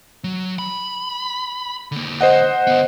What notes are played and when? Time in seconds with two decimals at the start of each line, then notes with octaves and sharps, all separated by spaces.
0.24 F#3
0.59 B5
1.92 D3 A#3
2.21 C5 D#5 F#5
2.67 D3 B3